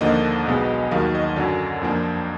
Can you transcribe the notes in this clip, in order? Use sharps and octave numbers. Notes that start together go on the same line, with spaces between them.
D#2 D3 F3 A#3 D4 D#5
B1 B2 G#3 B3
D#2 D#3 F#3 F5
D#5
F#2 D3 F#3 D5
F2 F3 A#3 D4